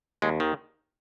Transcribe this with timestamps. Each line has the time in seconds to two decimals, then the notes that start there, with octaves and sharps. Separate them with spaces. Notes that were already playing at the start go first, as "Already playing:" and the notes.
0.22 D#2 G#3
0.40 D#3